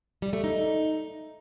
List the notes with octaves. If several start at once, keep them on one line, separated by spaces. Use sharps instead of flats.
G3
A3
D#4